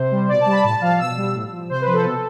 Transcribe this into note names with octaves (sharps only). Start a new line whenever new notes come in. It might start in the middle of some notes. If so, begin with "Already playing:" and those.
Already playing: C3 C5
G3
B2 D5
A5
G3
B5
A2 A5
F3 F5
B2 E6
G3
A2
F3
C3 C5
B4
F3
A4
B2